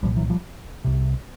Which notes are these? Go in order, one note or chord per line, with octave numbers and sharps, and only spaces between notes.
C2 A#2 F3 G3
E3 F#3
F3 G3
C2 C3